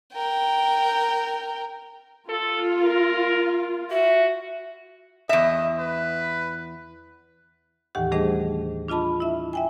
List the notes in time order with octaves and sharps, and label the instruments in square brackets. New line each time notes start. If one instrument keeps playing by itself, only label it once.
[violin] A#4 G5
[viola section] F4 [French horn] A4
[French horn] A#4
[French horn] F#4 [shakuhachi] E5
[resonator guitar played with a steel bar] E2 E5 [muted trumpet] D#5
[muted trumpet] B4
[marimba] D#2 A2 D#3 E3 G4 F#5
G3 A3 D4 G#4 C5 D#5
D4 F4 D#5 A5 B5
E4 E5
E5 G5 G#5